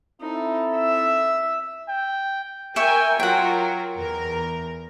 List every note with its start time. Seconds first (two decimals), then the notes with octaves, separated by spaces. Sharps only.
0.22 C4 D#4 E4 A4
0.77 E5
1.89 G5
2.76 A#4 E5 G5 G#5 C#6
3.20 F#3 F4 A#4 F#5 G5
3.97 E2 A#4